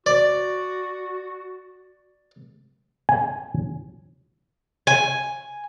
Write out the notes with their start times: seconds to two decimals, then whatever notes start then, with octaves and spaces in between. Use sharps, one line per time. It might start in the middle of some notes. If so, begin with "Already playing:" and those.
0.06 F#4 D5
3.09 G#5
4.87 G#5